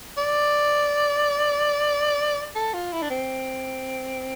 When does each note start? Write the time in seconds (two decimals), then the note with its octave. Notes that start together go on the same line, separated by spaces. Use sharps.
0.17 D5
2.55 A4
2.73 F4
2.92 E4
3.02 D4
3.10 C4